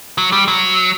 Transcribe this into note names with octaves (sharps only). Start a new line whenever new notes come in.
F#3
G3
F#3